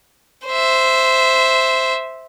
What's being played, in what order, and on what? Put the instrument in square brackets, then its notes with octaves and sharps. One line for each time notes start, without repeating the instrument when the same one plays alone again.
[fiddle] C5 E5